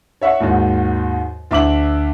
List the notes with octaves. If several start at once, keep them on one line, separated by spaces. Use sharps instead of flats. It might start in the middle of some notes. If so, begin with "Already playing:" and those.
C#5 E5 F#5 C#6
D#2 G#2 D#3 F#4
D2 E5 D6 F#7